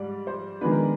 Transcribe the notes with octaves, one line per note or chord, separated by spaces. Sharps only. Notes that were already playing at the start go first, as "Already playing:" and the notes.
Already playing: G#2 G3 D5
C5
D#3 G#3 B3 D4 B4
A#4